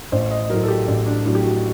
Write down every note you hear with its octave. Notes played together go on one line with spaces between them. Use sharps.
A1 C5
D#5
A2 F#3 A#4
A4
G4
A1
D4
A2 F#3 D4
G4
F#4